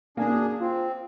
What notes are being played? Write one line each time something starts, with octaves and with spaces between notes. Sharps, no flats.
F#2 A#3 D4 G#4
C4 F4